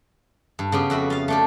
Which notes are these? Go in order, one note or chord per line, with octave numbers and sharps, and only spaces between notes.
G2
C#3 B3 G4
F2 F#4 E5 B5
F4 F5
A3 D4 G4